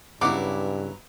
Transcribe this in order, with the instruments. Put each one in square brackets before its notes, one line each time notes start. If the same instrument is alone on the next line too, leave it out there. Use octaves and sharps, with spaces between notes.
[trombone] G2 [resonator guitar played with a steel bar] C#3 E4 [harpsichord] F#3 B3 [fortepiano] D6